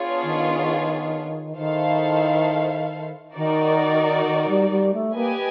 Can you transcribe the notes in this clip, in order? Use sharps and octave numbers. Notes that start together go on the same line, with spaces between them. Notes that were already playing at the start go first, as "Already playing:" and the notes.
Already playing: B3 D4 F4 G#4 C#5
D#3
D#3 E4 A4 C5 F5
D#3 D#4 F#4 A#4 D5
D#3
G3
G3
A3
A#3 G4 B4 D#5 G#5